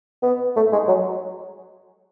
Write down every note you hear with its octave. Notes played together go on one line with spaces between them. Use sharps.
B3
A3
G#3
F#3